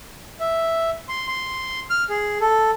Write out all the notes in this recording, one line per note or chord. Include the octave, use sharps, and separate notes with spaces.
E5
C6
C6
F6
G#4
A4